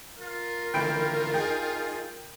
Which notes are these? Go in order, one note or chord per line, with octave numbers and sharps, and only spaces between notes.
F4 A#4
D3 E3 A3 G5 B5 D7
D#4 G#4 G5